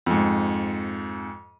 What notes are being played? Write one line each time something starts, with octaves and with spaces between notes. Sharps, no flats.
F2 G#2